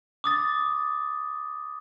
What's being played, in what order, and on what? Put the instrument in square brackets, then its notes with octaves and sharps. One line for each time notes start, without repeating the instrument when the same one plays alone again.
[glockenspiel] D6 D#6 A6